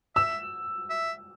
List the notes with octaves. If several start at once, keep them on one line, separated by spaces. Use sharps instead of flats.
E5 E6
E5